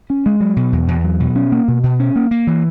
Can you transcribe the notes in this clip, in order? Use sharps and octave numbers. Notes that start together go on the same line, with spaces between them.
C#4
G#3
F#3
B2
E2
E2
F#3
B2
C#4
A#3
B2
B2
C#4
A#3
A#3
E3